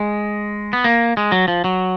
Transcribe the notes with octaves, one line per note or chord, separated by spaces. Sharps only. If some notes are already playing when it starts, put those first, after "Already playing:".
Already playing: G#3
B3
A#3
G#3
F#3
F3
F#3